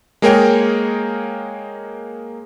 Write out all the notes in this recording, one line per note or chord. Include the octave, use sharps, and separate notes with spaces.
G#3 A#3 G#4 A#4 C#5 G5